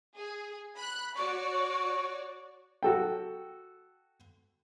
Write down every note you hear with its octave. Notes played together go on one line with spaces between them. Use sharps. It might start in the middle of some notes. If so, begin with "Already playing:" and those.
G#4
B5 F#6
F#4 C#5 D5 C#6
F#4 A4 G5